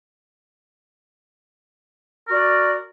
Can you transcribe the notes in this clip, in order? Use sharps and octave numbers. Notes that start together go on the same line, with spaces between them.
F#4 A#4 D5